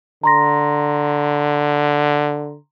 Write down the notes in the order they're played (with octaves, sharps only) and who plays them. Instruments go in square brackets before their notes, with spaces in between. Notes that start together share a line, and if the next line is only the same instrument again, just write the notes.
[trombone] D3 [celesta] A#5 C6 A#6